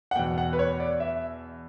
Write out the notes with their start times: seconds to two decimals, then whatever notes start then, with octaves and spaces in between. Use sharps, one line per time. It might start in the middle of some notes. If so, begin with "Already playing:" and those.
0.11 F#5
0.16 E2 B2 G5
0.38 F#5
0.53 B4
0.59 C#5
0.80 D5
1.00 E5